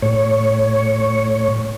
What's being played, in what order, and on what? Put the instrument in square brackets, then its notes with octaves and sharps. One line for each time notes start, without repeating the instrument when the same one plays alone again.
[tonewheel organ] A2 C#5